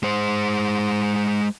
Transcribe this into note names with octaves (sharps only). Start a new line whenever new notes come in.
G#3 C5